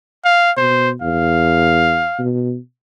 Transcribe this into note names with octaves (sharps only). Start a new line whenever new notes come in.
F5
B2 C5
E2 F5
B2